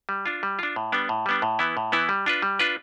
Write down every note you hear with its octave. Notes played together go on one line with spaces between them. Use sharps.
G3
D4 F4
G3
D4 F4
A2
G3 B3 D4
A2
G3 B3 D4
A2
E3 B3 E4
A2
E3 B3 E4
G3
D4 F4 B4
G3
D4 F4 B4